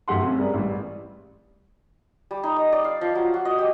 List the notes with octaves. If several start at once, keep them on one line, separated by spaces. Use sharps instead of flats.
G1 F#2 A3 G4 F#5 C6
C3 C#4
G3 B3 G#4 A#4 B4 D5
A1 G3
G3
D#4
D#6
D5
F5
F3
F#3
F#4
D#5
G4